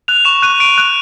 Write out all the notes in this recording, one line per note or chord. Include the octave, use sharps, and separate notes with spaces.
F#6 F7
C#6 E7
F#6 D#7
C#6 D7
F#6